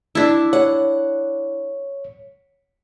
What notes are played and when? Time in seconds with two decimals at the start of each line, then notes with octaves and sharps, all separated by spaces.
0.15 D4 E4
0.53 C#5 F#5